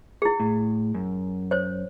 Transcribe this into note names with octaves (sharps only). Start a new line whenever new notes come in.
E4 G#4
A2
F#2
C5 C#5